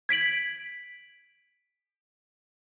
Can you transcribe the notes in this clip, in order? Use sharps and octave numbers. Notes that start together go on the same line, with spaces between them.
G#6 B6 D7 F#7